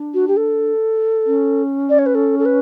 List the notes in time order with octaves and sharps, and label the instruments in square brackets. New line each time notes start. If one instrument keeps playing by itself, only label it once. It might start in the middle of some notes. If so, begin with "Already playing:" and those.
Already playing: [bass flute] D4
[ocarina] F#4
G4
A4
[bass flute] C#4
[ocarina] D5
C#5
B4
A4
A4
B4